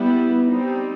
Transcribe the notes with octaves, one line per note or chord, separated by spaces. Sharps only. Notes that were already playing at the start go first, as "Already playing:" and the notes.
Already playing: G3 B3 E4
G3 C4 D#4